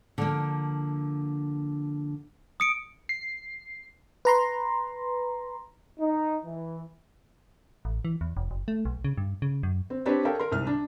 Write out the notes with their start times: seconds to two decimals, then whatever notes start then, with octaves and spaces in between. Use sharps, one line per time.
0.18 D3 F3 A#3
2.60 D#6 C#7 D7
3.09 C7
4.25 B4 A#5 C6
5.99 D#4
6.44 E3
7.85 A1
8.05 E3
8.21 E2
8.37 F1
8.51 F#1
8.68 A3
8.85 B1
9.05 C#3
9.17 G2
9.42 C#3
9.63 F#2
9.90 C4
10.06 C4 D4 G4 B4 C#5
10.25 A4 A#4 C#5 F5 G5
10.39 A#4 C6
10.52 C2 G#2 F6
10.67 D4